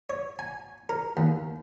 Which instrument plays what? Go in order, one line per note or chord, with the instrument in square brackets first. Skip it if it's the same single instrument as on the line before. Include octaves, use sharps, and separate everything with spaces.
[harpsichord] C#5
G#5
A#4
D#2